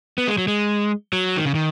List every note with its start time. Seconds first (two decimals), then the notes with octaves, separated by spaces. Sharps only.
0.18 B3
0.28 G#3
0.38 F#3
0.48 G#3
1.13 F#3
1.36 D#3
1.45 C#3
1.55 D#3